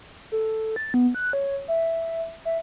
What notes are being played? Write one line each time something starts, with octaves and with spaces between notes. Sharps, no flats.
A4
A6
B3
F#6
C#5
E5
E5